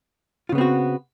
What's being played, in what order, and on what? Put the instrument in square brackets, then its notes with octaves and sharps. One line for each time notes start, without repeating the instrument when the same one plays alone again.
[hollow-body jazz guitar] F4
C#3
B3
C4
F#4